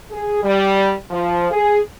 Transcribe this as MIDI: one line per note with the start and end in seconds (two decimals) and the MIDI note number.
0.11 0.42 68
0.43 0.92 55
1.10 1.47 53
1.51 1.79 68